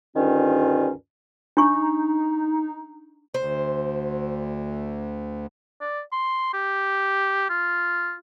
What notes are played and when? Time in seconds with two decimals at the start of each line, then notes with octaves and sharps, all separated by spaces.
0.15 D2 G2 D#3 C#4 F4
1.57 D4 D#4 C#6
3.34 D2 C5
5.81 D5
6.12 C6
6.54 G4
7.49 F4